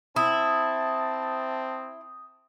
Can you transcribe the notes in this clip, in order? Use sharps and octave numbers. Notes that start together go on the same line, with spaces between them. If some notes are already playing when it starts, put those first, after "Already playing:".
C4 E4 A5 D#6